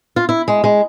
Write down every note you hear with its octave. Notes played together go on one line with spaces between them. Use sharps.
F4
E4
G#3
G#3